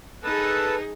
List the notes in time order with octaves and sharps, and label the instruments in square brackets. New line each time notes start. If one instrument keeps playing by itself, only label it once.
[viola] D#4 G#4 [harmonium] A4 B4 A5